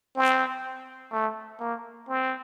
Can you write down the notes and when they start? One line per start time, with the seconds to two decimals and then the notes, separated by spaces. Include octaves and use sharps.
0.16 C4
1.12 A3
1.60 A#3
2.09 C4